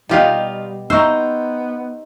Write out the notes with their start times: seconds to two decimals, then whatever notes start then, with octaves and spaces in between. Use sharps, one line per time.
0.09 B2 G3 D#4 F4 G4 F5
0.90 B3 D#4 C5 A#5 C#6 E6